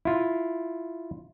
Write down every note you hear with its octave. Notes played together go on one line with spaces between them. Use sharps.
E4 F4